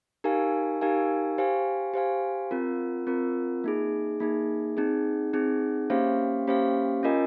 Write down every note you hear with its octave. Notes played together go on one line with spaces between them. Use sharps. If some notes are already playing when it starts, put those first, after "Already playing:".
D#4 G4 A#4 F5 G#5
D#4 G4 A#4 F5 G#5
G4 C5 F5 G#5
G4 C5 F5 G#5
C4 F4 A#4
C4 F4 A#4
A#3 D#4 G#4
A#3 D#4 G#4
C4 D#4 G#4
C4 D#4 G#4
A#3 C#4 G4 C5 F5
A#3 C#4 G4 C5 F5
C#4 F4 A#4 D#5 G#5